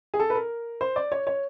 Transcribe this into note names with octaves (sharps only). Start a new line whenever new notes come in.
G#4
A4
B4
A#4
C5
D5
C#5
C#5